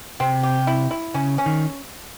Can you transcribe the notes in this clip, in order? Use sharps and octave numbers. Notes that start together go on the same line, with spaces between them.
C3 C4
G4
E4
E4
C#3 C#4
C#4
D#3